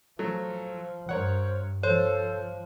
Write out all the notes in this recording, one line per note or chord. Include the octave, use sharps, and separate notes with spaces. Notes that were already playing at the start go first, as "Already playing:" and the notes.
F3 F#3 A3
G2 A#4 C5 C#5 F#5
F3 A4 C5 C#5